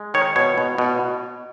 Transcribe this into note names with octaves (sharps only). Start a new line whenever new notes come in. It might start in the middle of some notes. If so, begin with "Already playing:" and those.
Already playing: G#3
D#3 C#5
B2 C#5
B2
B2